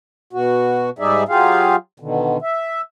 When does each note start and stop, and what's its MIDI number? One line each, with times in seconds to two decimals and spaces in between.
0.33 0.90 47
0.33 0.90 66
0.99 1.24 44
0.99 1.24 55
0.99 1.24 63
0.99 1.24 68
0.99 1.24 74
0.99 1.24 76
1.28 1.76 54
1.28 1.76 65
1.28 1.76 67
1.28 1.76 68
1.28 1.76 77
2.00 2.38 47
2.00 2.38 50
2.00 2.38 51
2.42 2.82 76